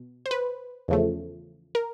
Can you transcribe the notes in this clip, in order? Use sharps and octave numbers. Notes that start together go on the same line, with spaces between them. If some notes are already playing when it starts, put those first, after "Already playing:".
Already playing: B2
C5
B4
E2 C#3 F3 A3
A#4